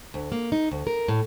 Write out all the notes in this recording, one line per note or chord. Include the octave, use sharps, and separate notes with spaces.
D2
A#3
D#4
D2
A#4
A2